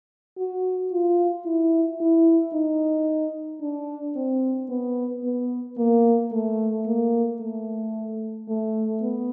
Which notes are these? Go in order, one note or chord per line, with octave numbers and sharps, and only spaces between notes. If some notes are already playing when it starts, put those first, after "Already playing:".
F#4
F4
E4
E4
D#4
D4
C4
B3
B3
A#3
A3
A#3
A3
A3
B3